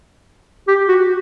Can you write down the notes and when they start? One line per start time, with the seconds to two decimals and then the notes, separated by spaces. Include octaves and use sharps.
0.68 G4
0.88 F#4